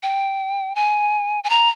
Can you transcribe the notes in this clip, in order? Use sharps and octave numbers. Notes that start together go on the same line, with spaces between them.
G5
G#5
G#5
A#5